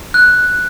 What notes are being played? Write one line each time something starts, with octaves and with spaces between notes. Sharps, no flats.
F#6